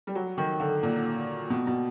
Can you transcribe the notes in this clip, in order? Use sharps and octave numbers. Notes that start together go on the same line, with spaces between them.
G3
F#3
D#3
D3
A#2
B2
B2